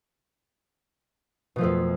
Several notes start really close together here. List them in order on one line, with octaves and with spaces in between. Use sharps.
B2 F3 A3 F2